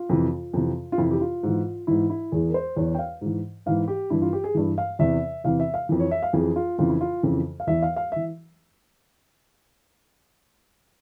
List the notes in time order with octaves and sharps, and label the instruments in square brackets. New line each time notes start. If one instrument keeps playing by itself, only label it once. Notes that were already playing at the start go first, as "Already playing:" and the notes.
Already playing: [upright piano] F4
F2 C3 E3
F2 C3 E3
F4
F2 C3 E3 E4
G4
F4
G#2 E3
G#2 E3 E4
E4
E2 E3 G#4
A#4
C5
E2 E3 C#5
G5
F5
G#2 E3
G#2 E3 F5
G4
G2 E3 E4
F4
G4
G#4
G2 E3
F5
E2 C3 E3 E5
E2 C3 E3 F5
E5
F5
F2 E3
C#5
E5
F5
F2 E3 G#4
F4
F2 C#3 E3 F4
E4
F4
F2 C#3 E3
F5
E2 E3 E5
F5
F5
E3 E5